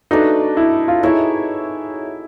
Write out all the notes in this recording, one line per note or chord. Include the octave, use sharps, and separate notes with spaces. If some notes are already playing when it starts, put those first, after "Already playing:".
A3 D4 D#4 F#4 B4
E4
F4
D#4 E4 G#4 C#5 E5